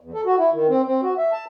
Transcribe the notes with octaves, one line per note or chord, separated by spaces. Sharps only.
E2
A4
F#4
E4
D#3
C4
C4
F#4
E5
A5